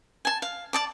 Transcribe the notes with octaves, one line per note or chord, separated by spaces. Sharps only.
G#5 A5
F5
D5 A5 D6